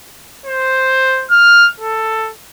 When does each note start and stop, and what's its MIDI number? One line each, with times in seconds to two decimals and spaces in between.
0.46 1.25 72
1.31 1.69 89
1.80 2.30 69